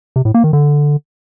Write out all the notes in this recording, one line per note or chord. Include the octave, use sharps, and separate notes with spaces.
C3
A2
A#3
D#3
D3